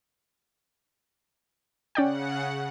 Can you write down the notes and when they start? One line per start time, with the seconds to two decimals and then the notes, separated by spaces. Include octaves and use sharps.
1.95 C#3 C#4 D5 F#5 G5